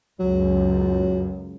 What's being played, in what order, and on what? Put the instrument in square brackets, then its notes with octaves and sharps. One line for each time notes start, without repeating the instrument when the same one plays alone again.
[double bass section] C#2 F#2 [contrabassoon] F#3